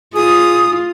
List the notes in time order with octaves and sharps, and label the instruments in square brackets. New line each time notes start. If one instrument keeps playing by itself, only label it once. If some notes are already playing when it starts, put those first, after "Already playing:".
[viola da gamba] F4 [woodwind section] G#4 D#6